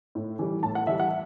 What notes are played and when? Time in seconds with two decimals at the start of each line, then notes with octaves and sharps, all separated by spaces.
0.15 A2
0.39 E3 G3
0.63 A2 A5
0.75 F#5
0.87 E3 G3 E5
1.00 F#5